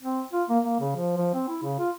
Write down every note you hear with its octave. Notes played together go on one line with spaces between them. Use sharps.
C4
F4
A#3
A#3
C#3
F3
F3
C4
E4
C#3
F4